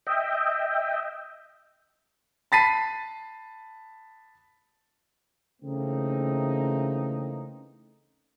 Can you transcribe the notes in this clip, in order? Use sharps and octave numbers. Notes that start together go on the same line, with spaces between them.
D#5 E5 G5
A5 B5 A6 B6 C7 D#7
C#3 E3 A3 A#3 C4 D#4